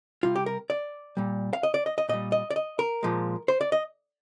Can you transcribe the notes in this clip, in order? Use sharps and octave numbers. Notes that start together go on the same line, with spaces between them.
C3 G3 F4
G4
A#4
D5
A#2 G3
F5
D#5
D5
D#5
D#5
A#2 G3 D#5
D#5
D5
D#5
A#4
A#2 F3 G#3
C5
D5
D#5